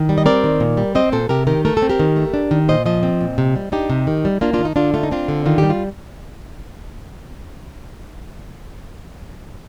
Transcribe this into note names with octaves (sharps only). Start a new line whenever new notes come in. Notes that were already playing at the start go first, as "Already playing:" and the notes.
Already playing: D#3
G3
D#5
C4 A#4 D5
D#3
A#2
G3
C4 C5 D#5
A#2 A4 C5
C3 G4 A#4
D#3 G4 A#4
A3 A#4
A4
C4
G4 A#4
D#3
A3
D4
D#3
A#2 C5 D#5
F3 C5 D#5
C4
A#2
C3
G3
D4 D#4 G4
C3
D#3
G3
A#3 D4 F4
D#3 D4 F4
D#4
D3 D4 F4
A3 F4
D#4
C4 D4 F4
D3
D#3 F4
G3 G4
F4